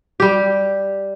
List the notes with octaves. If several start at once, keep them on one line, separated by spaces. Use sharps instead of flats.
G3 G4